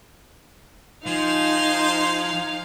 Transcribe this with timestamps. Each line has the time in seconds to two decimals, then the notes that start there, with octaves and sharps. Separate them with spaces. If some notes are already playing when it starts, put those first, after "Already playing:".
1.06 F3 D#4 C5 F5 G#5